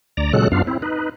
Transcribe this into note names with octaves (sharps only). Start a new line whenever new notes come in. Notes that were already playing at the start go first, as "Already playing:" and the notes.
D2 D5 A#5
A#2 C#3 F#3 G#3 A4 F#6
F#2 B3 D4 F4 F5
C4 E4
D#4 B4